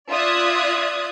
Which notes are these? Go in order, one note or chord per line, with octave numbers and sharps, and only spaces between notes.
F4 D5 E5 D#6 F#6 G#6